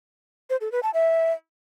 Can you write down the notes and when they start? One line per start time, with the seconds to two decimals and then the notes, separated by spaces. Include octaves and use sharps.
0.50 C5
0.61 A4
0.72 B4
0.83 A5
0.94 E5